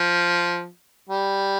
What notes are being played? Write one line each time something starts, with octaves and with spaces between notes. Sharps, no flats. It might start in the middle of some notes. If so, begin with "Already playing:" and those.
Already playing: F3
G3